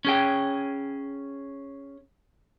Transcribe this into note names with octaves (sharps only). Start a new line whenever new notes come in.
C#4 G#4 G5